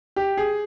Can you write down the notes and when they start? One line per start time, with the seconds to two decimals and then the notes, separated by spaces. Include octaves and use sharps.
0.16 G4
0.37 G#4